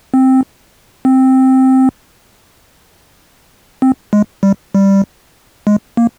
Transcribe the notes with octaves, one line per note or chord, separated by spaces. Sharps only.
C4
C4
C4
G#3
G3
G3
G#3
A#3